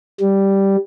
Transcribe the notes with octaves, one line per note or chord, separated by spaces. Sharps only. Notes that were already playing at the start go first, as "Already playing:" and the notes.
G3